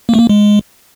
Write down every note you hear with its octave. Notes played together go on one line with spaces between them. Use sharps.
A#3
A3
A#3
G#3